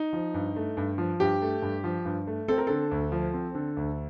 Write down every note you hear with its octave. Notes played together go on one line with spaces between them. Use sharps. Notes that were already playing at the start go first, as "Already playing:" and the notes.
Already playing: D#4
F3
G2
A3
G2
F3
G2 G4
A3
G2
F3
G2
A3
C4 A4
A#4
D3 A4
D2
F3
C4
D3
D2